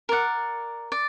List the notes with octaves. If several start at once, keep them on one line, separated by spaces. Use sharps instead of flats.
A#4 D5 F#5
D5